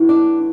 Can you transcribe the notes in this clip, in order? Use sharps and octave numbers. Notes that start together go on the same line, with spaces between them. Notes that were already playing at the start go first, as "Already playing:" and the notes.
Already playing: A2 E3 B3
D4